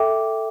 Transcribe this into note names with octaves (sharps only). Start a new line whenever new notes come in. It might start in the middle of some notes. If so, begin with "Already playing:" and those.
Already playing: A4 E5 G5 D6